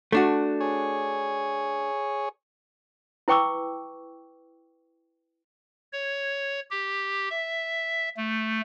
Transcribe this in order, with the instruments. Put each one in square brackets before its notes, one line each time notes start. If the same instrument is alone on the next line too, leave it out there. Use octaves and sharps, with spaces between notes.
[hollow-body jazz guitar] A3 D4 F#4
[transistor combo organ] G#4 C#5
[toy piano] E4 B4 G5 C#6 D6 E6
[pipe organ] C#5
G4
E5
A3